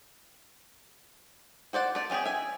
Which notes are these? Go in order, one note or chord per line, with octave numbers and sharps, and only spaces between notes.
F#4 C5 D5 F#5
A3 D5
B3 C#4 F4 G4 G#4
E5 G#5